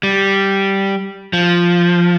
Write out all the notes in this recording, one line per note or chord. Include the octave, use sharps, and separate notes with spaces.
G3
F3